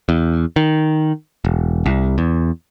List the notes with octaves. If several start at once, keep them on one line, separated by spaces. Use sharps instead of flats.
E2
D#3
E1
C2
E2